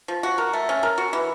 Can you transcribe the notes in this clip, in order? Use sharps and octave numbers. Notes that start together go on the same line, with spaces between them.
F3
F#4
A#4
A3
C#4
A#4
F#4
E3